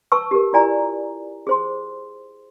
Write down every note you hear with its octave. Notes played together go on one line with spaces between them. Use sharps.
B4 A5 C#6 E6
G4 A#4
E4 F4 D5 G#5 A#5
G#4 C5 C6